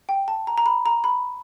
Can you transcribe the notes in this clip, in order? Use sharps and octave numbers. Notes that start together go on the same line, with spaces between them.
G5
A5
A#5
A#5
B5
A#5
B5